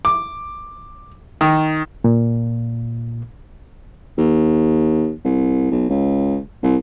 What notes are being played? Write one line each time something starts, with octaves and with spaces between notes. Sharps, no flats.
D6
D#3
A#2
D#2
C2
B1
C#2
C2